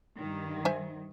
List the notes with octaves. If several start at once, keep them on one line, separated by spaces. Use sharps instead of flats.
G2 D#3
C5 E5 G#5